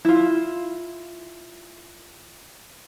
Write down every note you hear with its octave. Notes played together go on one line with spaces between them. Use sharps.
E4 F4